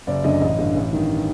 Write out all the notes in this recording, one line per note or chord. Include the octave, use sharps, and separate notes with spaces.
F#1 D5
F#2 D3 D#5
A1 D#5
G2 D3
A1
G2 D#3